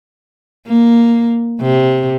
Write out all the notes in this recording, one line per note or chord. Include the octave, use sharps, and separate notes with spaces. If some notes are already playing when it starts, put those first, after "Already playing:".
A#3
C3